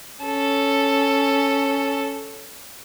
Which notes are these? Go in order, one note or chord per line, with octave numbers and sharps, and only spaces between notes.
C#4 A4